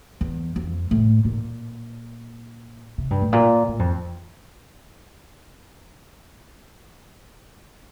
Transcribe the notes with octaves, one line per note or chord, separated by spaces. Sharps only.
E2
F2
A2
A#2
C3
G2
A2
A#2
A2
F2